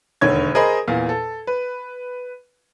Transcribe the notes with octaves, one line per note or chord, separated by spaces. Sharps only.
E1 D#2 D3 C#5 G#6
G#4 A#4 C5 D#5 B5
E2 A#2 F5
A4
B4